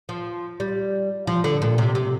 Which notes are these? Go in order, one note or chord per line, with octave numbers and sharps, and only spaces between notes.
F3
G3
F3
D3
A#2
C3
C3